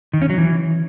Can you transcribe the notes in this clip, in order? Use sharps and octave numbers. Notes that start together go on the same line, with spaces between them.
D#3
C#4
F#3
E3